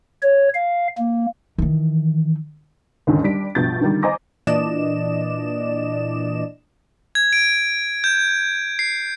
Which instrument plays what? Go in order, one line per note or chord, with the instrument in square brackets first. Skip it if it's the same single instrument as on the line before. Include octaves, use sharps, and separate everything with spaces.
[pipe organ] C#5
F5
A#3
[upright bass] D#3 E3
[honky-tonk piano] D#2 G#2 D3 C#4
G3 D4 B6 D7
A#1 G2 B2 G6 A6
D3 D#3 G3
C5 D#5 G#5 A#5 D6 A#6
[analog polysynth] A#2 E3 D4 D5 D#5 E7
[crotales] G#6
D7
G6
C7